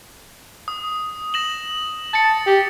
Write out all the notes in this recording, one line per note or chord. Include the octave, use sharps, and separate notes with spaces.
D#6
A#6 E7 F#7
A5 A6 C#7
G4